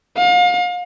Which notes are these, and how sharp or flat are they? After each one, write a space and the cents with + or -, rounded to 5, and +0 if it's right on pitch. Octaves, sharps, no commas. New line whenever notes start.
F5 +35